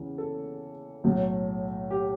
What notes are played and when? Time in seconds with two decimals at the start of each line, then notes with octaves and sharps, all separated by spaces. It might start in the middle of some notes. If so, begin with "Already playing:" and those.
Already playing: E2 C#3 E3
0.18 A4
1.04 B1 A2 F#3 A3
1.91 G4